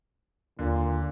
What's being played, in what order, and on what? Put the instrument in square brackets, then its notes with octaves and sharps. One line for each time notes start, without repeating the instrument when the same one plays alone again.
[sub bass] D#2 [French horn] A#2 [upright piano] D3